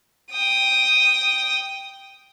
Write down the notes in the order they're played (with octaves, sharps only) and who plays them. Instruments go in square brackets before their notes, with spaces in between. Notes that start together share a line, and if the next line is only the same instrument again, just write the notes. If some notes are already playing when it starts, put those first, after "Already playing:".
[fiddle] G5 D#6